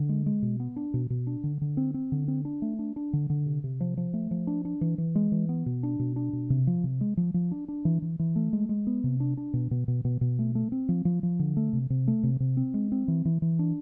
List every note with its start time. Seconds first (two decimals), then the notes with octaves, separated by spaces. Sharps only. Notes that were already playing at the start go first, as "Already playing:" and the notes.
Already playing: D3
0.09 G#3
0.26 G#3
0.43 B2
0.60 B3
0.76 D4
0.94 B2
1.10 B2
1.27 D4
1.44 D3
1.61 D3
1.77 C4
1.94 C4
2.12 D3
2.28 C4
2.45 D4
2.62 A3
2.79 D4
2.96 D4
3.13 D3
3.30 D3
3.46 C3
3.64 C3
3.80 F3
3.97 F3
4.14 A3
4.31 F3
4.47 D4
4.65 D4
4.81 E3
4.98 E3
5.15 G#3
5.32 E3
5.49 B3
5.66 B2
5.83 D4
5.99 B2
6.16 D4
6.33 B2
6.50 C3
6.67 F3
6.84 C3
7.01 G#3
7.17 F3
7.34 F3
7.51 D4
7.68 D4
7.85 E3
8.02 E3
8.19 E3
8.36 A3
8.53 G#3
8.69 G#3
8.87 B3
9.04 C3
9.20 D4
9.37 D4
9.53 B2
9.71 B2
9.88 B2
10.05 B2
10.21 B2
10.39 A3
10.55 A3
10.72 C4
10.89 F3
11.05 F3
11.23 F3
11.39 D3
11.57 A3
11.73 C3
11.90 C3
12.08 A3
12.23 C3
12.40 C3
12.57 C4
12.74 G#3
12.92 C4
13.08 E3
13.25 E3
13.42 E3
13.59 D4